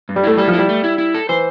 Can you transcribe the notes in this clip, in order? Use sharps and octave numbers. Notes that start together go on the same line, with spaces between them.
G2
G3
A3 E4
G3 A4
F3
E4
G3
A3
E4
E4
A4
E3 C5